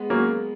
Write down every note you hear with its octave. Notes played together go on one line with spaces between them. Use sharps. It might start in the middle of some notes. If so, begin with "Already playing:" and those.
Already playing: G#3 B3
F#3 A#3 C#4